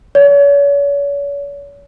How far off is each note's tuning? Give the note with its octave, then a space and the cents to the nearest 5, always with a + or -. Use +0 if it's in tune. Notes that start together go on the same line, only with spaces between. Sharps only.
C#5 +40